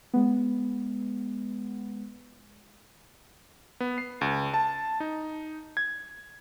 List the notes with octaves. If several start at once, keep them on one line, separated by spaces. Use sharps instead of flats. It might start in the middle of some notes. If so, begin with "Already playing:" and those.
G#3 B3
B3
C7
C#2
A5
D#4
G#6